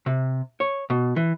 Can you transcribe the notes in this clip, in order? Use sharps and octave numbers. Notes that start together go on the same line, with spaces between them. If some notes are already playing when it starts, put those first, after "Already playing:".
C3
C#5
B2
E3